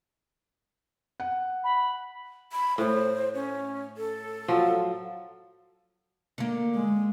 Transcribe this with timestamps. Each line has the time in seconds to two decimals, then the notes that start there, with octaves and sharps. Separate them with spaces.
1.20 F#5
1.64 B5
2.53 B5
2.78 A2 C5
3.34 C#4
3.97 A4
4.48 F3 F#3
6.38 D3 A#3
6.75 G#3